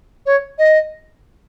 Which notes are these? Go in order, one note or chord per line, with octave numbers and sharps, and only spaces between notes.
C#5
D#5